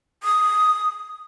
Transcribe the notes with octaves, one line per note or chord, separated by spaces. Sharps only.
D#6